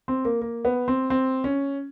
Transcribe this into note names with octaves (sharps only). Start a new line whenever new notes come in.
C4
A#3
A#3
B3
C4
C4
C#4